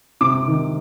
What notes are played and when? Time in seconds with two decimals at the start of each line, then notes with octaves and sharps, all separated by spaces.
0.21 C3 D6
0.48 D#3